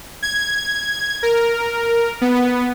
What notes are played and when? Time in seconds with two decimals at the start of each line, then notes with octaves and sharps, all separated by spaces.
0.22 G#6
1.23 A#4
2.21 B3